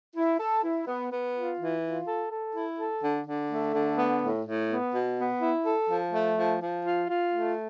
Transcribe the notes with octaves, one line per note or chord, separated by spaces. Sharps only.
E4
A4
E4
B3
B3
F4
E3
F4
A4
A4
E4
A4
D3
D3
A3
D3
B3
A2
A2
B3
B2
B3
E4
A4
F3
A3
F3
F3
F4
F4
A3